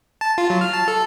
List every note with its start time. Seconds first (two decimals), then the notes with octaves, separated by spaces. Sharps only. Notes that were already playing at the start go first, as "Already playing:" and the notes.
0.21 A5
0.38 F4
0.50 F#3
0.61 F6
0.73 A5
0.88 A4